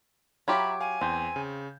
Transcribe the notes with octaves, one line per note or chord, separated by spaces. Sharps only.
F#3 F4 G4 E5 A#5 B5 G#6
F5 G#5
E2 C4 G6
C#3